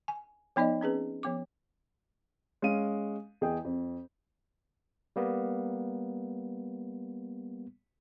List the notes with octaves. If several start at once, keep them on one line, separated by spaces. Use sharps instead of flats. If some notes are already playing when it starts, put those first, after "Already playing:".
G#5
F3 B3 D#4 D5 D#5
C4 C#4 G#4 B4
F3 B3 D6
G#3 C#4 F5 D#7
E2 G#4 D#5 G5
F2
G3 A#3 B3